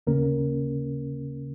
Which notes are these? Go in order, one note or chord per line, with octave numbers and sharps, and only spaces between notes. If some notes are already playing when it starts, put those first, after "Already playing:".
D#2 C#3 A#3 C#4 A#4